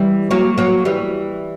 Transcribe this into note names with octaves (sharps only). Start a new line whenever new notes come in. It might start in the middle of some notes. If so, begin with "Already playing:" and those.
Already playing: E3 G3
F#3 A#3
F#3 A#3
E3 G3